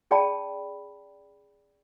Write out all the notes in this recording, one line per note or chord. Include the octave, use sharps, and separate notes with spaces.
C#4 G#4 D5 G5 A5 B5